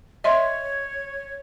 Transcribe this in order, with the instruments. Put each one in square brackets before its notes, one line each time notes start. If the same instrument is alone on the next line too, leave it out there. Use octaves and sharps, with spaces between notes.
[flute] C#5 [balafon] D#5 E5 C6